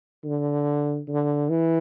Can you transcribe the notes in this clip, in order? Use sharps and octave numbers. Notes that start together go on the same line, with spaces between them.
D3
D3
E3